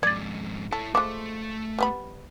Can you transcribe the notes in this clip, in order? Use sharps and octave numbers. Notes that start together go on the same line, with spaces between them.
F2 G#2 D5 G#6 A6
E4 A4 C#5
F3 G#3 A3 A4 D6
G3 B3 B5